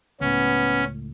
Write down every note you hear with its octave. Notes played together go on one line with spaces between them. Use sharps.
C#2 A2 B3 C#4